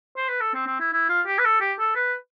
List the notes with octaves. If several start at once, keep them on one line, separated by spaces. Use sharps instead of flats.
C5
B4
A4
C4
C4
E4
E4
F4
G4
B4
A4
G4
A4
B4